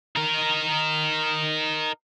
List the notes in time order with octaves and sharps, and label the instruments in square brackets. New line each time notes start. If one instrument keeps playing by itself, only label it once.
[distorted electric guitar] D#4 A#4